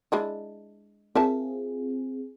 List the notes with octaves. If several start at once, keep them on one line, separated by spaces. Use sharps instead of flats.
G#3 D4 E4
C4 F4 G#4 A#4 E5 A5